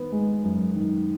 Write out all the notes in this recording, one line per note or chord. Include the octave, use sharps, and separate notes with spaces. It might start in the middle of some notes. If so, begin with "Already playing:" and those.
Already playing: D#3 B3
G#3
F#2
D#3